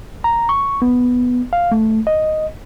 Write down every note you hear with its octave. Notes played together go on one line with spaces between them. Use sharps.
A#5
C#6
B3
F5
A3
D#5